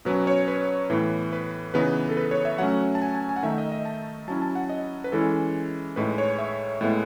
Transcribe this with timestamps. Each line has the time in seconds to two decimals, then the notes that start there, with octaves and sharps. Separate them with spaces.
0.05 B2 F#3 C#4 B4
0.27 C#5
0.48 B4
0.90 A2 E3 B3
1.33 B4
1.74 C#3 E3 B3 D#4 B4
2.09 A4
2.17 B4
2.31 C#5
2.45 E5
2.58 F#3 A3 C#4 F#5
2.95 A5
3.02 G#5
3.15 G#5
3.29 G#5
3.36 F#5
3.43 D#3 A3 D#4 E5
3.58 D#5
3.72 D#5
3.85 A5
4.28 F#3 C#4 E4 A5
4.42 A5
4.55 F#5
4.69 D#5
5.04 B4
5.12 E3 G#3 C#4 E4 A4
5.96 A2 G#3 D#4 B4
6.18 C#5
6.38 E5
6.81 A2 G#3 B3 E4